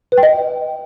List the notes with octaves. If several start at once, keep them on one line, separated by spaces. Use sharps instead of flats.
B4
G5
D#5